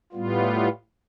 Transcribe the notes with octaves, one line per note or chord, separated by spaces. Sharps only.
A2 G3 B3 F4